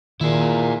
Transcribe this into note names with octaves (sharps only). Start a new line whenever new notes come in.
A#2 D#3 E4 G#4